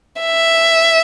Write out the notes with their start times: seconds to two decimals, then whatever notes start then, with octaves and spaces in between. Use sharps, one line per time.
0.21 E5